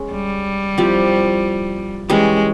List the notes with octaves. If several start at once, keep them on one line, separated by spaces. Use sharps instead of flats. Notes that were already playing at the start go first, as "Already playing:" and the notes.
Already playing: G#3 C#4
G3
F3 C4 E4 G4
E3 G3 G#3 C#4